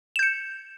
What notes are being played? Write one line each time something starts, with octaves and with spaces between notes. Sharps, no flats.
G6 C#7 E7